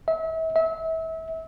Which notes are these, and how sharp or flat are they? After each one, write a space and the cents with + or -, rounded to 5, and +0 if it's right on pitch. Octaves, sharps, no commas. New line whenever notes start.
E5 -35
E5 -30